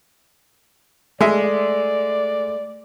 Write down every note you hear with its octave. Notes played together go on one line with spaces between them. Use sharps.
G#3 A3 D5 E5